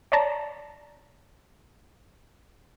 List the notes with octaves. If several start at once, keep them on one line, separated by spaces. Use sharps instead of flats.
C#5 D5 A5 A#5